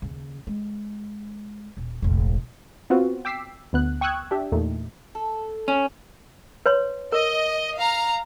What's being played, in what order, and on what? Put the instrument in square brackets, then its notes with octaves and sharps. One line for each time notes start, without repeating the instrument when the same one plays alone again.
[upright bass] D#2 C#3
G#3
D#1
E1 A1
[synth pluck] B3 C4 F4 F#4
G5 D6 E6 B6 C7
D2 B3 F#6
G5 C#6 D#6 E6 F#6 G#6
D4 G4 E5
E2 A#2 A3 D#4
[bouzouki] A4
[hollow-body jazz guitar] C#4
[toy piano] B4 C#5 C6
[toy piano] A#4 [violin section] D#5
[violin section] F5 A#5